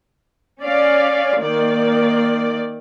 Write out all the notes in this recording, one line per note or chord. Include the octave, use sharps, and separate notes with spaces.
C#4 D5 F5
D#3 A#3 D5